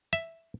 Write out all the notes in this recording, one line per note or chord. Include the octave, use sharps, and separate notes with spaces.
E5